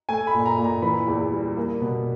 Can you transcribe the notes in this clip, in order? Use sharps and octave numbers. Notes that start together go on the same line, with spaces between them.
A3 G#5
B5
A#2
A#5
A#2
A#5
E3 B5
E2
G3
A#3
B2